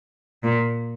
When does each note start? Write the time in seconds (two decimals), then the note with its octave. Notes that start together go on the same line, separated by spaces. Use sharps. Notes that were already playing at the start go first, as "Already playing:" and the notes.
0.43 A#2